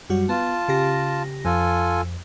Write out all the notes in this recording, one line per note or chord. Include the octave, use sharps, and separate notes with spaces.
F#2 G3 F#4
B3 F4 A5
C#3 G4 A#6
F2 F4 A4 G#5